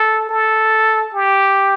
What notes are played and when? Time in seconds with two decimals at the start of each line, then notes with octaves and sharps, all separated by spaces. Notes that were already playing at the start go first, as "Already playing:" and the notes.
Already playing: A4
0.29 A4
1.14 G4